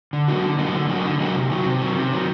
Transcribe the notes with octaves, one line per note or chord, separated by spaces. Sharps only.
D3
F#3 A#3 D#4 F#4
D3
F#3 A#3 D#4 F#4
D3
F#3 A#3 D#4 F#4
D3
F#3 A#3 D#4 F#4
C3
D#3 F#3
C3
D#3 F#3
C3
D#3 F#3